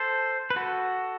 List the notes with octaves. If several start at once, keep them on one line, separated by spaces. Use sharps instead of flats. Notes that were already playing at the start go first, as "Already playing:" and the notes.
Already playing: A4 C5
B4
F#4 A4